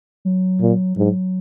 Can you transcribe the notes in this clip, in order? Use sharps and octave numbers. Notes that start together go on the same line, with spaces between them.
F#3
A#2
G#2 F#3